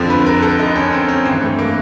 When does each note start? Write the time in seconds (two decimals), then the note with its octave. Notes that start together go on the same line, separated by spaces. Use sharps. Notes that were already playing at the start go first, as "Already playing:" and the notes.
Already playing: F2 D3 F3
0.10 B4
0.26 A#4
0.42 A4
0.59 D#4
0.75 C#4
0.92 C4
1.08 C#4
1.25 G2 C4
1.29 E3
1.41 A3
1.59 A#3